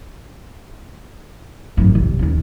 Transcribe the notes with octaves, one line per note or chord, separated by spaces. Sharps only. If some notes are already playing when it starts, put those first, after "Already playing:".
G#1 F#2
C2
D#2 C#4